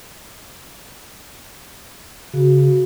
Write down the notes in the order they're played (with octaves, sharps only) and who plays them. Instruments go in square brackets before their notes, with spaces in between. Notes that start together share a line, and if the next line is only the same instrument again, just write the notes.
[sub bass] C#3 [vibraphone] F#4